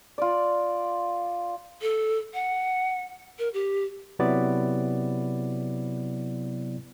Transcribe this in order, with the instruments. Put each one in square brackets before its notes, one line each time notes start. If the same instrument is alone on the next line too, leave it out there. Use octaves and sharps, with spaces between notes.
[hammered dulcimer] F4 D5
[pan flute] A4
F#5
A#4
G4
[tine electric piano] C3 F#3 B3 E4 D5